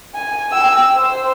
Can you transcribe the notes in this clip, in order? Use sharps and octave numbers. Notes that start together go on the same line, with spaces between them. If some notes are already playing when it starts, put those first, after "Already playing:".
G#5
G5 E6
C5